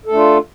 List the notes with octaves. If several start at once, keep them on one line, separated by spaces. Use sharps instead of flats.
A3 D4 F4 A4